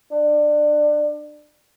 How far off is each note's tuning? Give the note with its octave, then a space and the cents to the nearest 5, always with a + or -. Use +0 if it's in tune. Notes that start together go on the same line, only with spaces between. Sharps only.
D4 +20